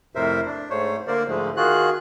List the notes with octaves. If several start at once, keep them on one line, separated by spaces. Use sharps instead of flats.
F2 A2 C3 A#4 C5 E5
D4
G#2 A3 C5 C#5
D3 A#3 A#4 C5 D5
G#2 D3 F3 G#3 A3
D#3 F4 F#4 G#4 F#6